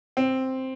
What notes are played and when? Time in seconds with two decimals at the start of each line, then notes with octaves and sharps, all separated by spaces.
0.17 C4